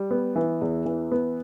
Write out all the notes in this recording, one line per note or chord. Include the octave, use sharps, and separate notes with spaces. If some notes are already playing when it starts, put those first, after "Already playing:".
Already playing: G3
B3
E3
E2
E3
B3